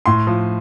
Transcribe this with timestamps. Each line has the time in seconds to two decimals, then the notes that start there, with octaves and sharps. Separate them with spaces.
0.06 A2 C6
0.27 F3